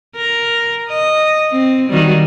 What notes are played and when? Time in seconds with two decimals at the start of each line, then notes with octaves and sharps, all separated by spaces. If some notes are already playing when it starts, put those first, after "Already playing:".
0.15 A#4
0.89 D#5
1.51 C4
1.89 D#3 F#3 G3